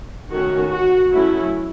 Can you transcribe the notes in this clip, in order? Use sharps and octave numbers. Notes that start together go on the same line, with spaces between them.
D#3 A3 C#4 F#4
F#4
F#3 A3 C#4 E4